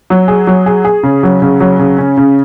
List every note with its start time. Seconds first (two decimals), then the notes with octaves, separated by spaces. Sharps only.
0.10 F#3
0.28 G#4
0.47 F#3
0.66 G#4
0.84 G#4
1.03 C#3
1.23 F#3
1.42 C#3
1.60 F#3
1.79 C#3
1.98 C#4
2.17 C#3